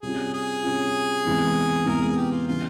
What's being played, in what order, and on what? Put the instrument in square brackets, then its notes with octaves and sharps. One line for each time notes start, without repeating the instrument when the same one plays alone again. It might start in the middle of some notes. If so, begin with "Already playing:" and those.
[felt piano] C3 G3 C#4 F4 [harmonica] G#4
[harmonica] G#4
[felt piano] C3 G3 C#4 F4
E2 C3 E3 G#3
[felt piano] E2 C3 E3 G#3 [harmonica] A#4
[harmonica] G#4
G4
F4
[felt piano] C#3 E3 G3 [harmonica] F4